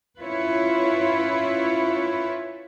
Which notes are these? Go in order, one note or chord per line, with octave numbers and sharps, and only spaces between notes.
C#4 E4 F4 B4 C#5